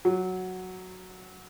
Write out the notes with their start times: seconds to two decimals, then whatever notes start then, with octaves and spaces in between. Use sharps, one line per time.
0.05 F#3